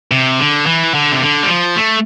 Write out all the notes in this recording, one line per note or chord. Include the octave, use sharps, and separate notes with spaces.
C3
D3
E3
D3
C3
D3
G3
F3
A3